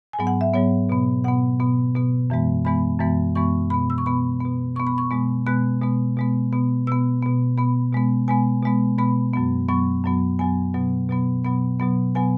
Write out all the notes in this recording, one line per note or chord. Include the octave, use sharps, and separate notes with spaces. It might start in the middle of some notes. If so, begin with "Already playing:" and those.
G#5
G#2 F#3 B3
F#5
E5
G#2 F#3 B3 C#5
B2 B3
B2 B3 F#5
B2 B3
B2 B3
F#2 E3 G#3 B3
F#2 E3 G#3 B3 B5
F#2 E3 G#3 B3
F#2 E3 G#3 B3 C#6
B2 B3 B5
E6
C#6
B2 B3 B5
B2 B3
B2 B3 C#6
B5
C#6
B2 G#3 B3
B2 G#3 B3 F#6
B2 G#3 B3
B2 G#3 B3
B2 B3
B2 B3 E6
B2 B3
B2 B3 B5
B2 G#3 B3
B2 G#3 B3 G#5
B2 G#3 B3
B2 G#3 B3 B5
F#2 F#3 B3
F#2 F#3 B3 C#6
F#2 F#3 B3
F#2 F#3 B3 G#5
B2 F#3 B3
B2 F#3 B3
B2 F#3 B3 B5
B2 F#3 B3
B2 F#3 B3 G#5